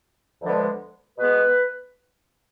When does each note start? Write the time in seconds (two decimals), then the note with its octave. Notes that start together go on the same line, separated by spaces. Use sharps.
0.42 D2 D3 F3 G#3 B3
1.18 B2 G#3 B3 B4